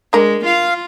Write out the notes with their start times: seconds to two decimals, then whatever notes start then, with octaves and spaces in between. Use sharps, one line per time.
0.13 G#3 D4 A#4
0.45 F4 F5